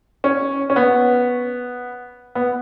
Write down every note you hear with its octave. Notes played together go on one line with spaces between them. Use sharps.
C#4
C#4
B3
B3